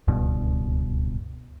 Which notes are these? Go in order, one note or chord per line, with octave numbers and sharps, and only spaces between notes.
D1 C#2 G2 B2